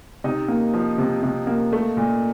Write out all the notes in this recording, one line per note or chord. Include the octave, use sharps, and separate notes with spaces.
C3 D#4 D#5
A#3
F3
C3
C3
A#3
A3
A#2